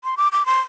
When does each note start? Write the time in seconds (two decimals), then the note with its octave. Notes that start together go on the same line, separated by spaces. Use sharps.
0.04 C6
0.17 D6
0.32 D6
0.46 C6